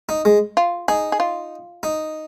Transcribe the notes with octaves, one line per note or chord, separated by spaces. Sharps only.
D#4
G#3
F4
D#4 G#4
G#4
F4
D#4